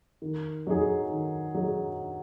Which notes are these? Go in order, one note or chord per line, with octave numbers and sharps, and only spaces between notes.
D#3
F#3 D#4 G#4
D#3
F#3 D#4 G#4